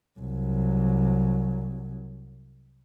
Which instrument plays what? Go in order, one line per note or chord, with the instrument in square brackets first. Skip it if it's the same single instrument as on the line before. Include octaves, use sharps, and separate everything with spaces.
[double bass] C2 F#3